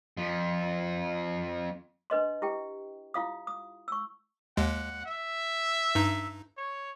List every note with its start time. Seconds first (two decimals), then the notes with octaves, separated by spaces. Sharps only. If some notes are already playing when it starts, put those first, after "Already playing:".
0.17 F2 F3
2.10 D4 B4 D#5 C6
2.42 E4 G4 G5
3.14 E4 F4 F5 D#6
3.47 D#6
3.88 C#6 E6
4.57 D#2 G#3 F#5
5.06 E5
5.95 G2 D#4
6.57 C#5